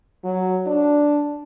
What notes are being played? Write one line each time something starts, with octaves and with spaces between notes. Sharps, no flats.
F#3
D4